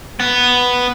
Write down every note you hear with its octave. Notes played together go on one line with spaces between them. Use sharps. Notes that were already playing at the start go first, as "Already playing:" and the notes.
B3